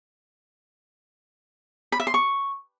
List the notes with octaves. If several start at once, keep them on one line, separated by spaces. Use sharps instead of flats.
B5
E5
C6
C#6